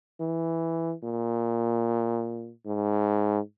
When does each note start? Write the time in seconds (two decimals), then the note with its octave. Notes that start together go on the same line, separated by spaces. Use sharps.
0.20 E3
1.03 A#2
2.66 G#2